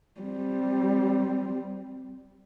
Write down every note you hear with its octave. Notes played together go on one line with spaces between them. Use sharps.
G3 C4